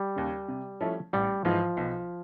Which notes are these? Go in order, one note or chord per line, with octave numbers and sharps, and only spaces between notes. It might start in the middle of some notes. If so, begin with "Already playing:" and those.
Already playing: G3
D#2 C#3
C3
F3 A3 C#4 E4
A1 G3
G#2 E3 F3
B1